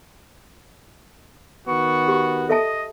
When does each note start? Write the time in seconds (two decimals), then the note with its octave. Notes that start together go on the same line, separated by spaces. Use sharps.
1.68 D#3 B3 F#4 C#6
2.08 G4
2.49 A4 D#5 E5 A5